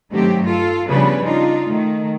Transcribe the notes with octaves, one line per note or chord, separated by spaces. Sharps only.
G2 D#3 F#3 A3 C4 G4
F4 A4
C#3 F3 G3 B3 D4 B4
D4 D#4 F4
D#3 A3